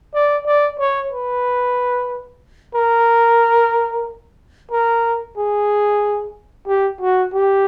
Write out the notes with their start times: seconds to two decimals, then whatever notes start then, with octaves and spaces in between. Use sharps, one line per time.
0.14 D5
0.46 D5
0.79 C#5
1.12 B4
2.75 A#4
4.71 A#4
5.37 G#4
6.67 G4
7.01 F#4
7.33 G4